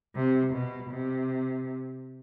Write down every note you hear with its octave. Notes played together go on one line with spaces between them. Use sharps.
C3
B2
C3